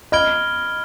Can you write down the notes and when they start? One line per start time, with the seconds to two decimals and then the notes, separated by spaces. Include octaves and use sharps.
0.12 D#5 B5 F6 G#6 D7 G7